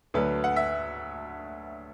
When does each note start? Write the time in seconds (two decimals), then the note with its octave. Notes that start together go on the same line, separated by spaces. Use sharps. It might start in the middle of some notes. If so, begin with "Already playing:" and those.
0.14 D2 D3 F#3 A3 B4
0.44 F#5
0.56 E5